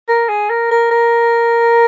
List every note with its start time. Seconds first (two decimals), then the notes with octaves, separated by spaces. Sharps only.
0.08 A#4
0.28 G#4
0.50 A#4
0.71 A#4
0.91 A#4